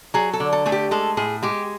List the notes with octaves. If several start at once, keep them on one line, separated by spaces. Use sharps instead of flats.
F#3 G#4
A4
D3
A4
A3 G#4
G4
G#3 A4
A2 G#4
G#3 G4